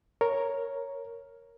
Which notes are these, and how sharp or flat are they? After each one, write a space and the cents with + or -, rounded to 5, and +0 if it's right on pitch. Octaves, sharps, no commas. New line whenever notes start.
A#4 +0 C#5 +0